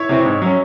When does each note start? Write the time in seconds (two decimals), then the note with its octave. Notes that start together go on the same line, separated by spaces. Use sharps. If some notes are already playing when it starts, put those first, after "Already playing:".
Already playing: E4 C#5
0.09 C3 E3 C4
0.25 G#2
0.42 F#3 C#4